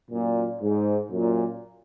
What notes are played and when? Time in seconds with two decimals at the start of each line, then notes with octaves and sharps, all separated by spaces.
0.10 F#2 A#2
0.61 G#2
1.10 F#2 A#2